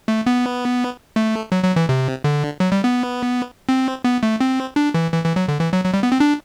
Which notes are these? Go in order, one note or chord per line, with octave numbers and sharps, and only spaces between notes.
A3
B3
A3
F#3
F#3
E3
C3
D3
F#3
G3
B3
C4
B3
A3
C4
D4
E3
E3
E3
F#3
D3
E3
F#3
F#3
G3
B3
C4
D4